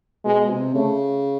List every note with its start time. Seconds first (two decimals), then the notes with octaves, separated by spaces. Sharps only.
0.25 B2 G#3
0.50 C3
0.73 C#3 A3